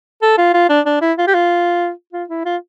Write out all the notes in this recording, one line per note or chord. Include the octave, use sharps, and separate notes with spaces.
A4
F4
F4
D4
D4
E4
F4
G4
F4
F4
E4
F4